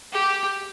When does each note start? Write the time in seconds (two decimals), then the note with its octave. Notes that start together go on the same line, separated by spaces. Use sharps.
0.12 G4